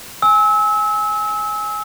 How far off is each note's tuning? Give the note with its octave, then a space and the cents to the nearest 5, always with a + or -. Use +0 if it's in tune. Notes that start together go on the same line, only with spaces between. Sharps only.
G#5 +0 E6 -30